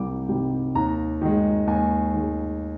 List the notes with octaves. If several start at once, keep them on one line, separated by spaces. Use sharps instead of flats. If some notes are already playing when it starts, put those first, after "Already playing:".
Already playing: C2 C3 G3 G5 D6
C3 D#3 G3
D#2 A#5
D#3 G#3
D#2 G#5
D#3 G#3